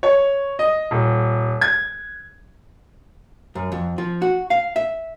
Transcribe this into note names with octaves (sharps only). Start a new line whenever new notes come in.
C#5
D#5
D#1
G#6
F#2
F2
F3
F#4
F5
E5